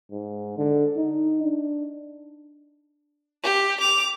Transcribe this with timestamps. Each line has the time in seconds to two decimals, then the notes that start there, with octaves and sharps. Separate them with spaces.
0.12 G#2
0.57 D3
0.97 D#4
1.43 D4
3.43 G4
3.80 D6 F7